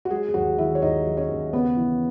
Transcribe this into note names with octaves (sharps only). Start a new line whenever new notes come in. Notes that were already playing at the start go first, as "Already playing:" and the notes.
F#4
F#3 G#3 G#4
G#4
D#2 F#3 F#4
D#3 E4 E5
C#5
D#2 D#4 D#5
F#3
C#4 C#5
D#2
C#3 B3 B4
E3